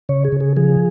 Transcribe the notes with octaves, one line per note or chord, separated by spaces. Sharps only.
C#3 C#5
G#4
C#3
G#4
F3 G#4